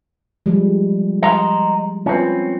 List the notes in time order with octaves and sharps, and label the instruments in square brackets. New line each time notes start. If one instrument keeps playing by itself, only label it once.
[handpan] F3 G3 G#3
[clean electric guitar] D#5 A#5 C6
[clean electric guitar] C4 C#4 [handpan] F4 B4